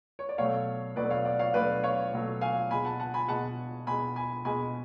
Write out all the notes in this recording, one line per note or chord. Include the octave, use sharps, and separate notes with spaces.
C#5
D5
B2 F#3 A3 C#5 F5
B2 F#3 A3 B4 D5
C#5 F5
D5 F#5
C#5 F5
B2 F#3 A3 B4 D5
C#5 F5
B2 F#3 A3
F5 G#5
B2 G#3 G#5 B5
F#5 A5
F#5 A5
G#5 B5
B2 G#3 F#5 A5
B2 G#3 G#5 B5
G#5 B5
B2 G#3 G#5 B5